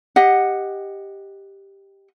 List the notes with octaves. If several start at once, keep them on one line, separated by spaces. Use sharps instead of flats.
G4 D#5 F#5